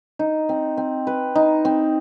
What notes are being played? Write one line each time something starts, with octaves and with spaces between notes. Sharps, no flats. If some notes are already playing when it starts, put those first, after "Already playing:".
D#4
C4
C4
B4
D#4
C4